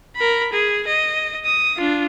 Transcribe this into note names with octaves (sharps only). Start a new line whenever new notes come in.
A#4 B5
G#4
D#5
D#6
D4 F4